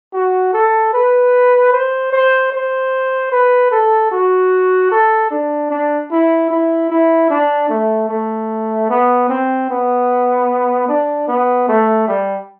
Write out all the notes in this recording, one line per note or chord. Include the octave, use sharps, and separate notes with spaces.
F#4
A4
B4
C5
C5
C5
B4
A4
F#4
A4
D4
D4
E4
E4
E4
D4
A3
A3
B3
C4
B3
D4
B3
A3
G3